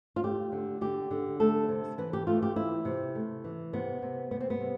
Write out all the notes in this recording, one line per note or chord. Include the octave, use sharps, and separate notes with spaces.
F4
A3 G4
D3
D3 G4
D3
A3 A4
C3
E3 B4
G4
A3 F4
G4
E3 E4
C3
A3
E3
C3 B3
C3
G3 B3
C4
B3
C3